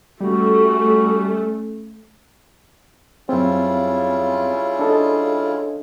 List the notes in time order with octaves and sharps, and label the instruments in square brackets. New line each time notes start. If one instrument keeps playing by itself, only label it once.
[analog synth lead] G3 [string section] A3 [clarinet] C#4 [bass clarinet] F#4
[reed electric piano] F#2 C4 [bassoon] C#3 [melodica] G3 E4 F4
[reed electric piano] D4 A4 D#5